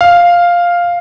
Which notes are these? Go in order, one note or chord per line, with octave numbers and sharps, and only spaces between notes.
F5